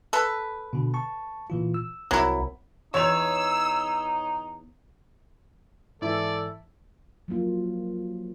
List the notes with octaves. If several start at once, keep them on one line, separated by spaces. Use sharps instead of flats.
A4 B4
B2 D3
A5 C#6
A#2 E3 F4
E6
C2 F#3 C4 E4 A#4
E2 D#4 C#5 E6 F7
G#2 E3 E4 A4 D5
F3 F#3 A#3 F4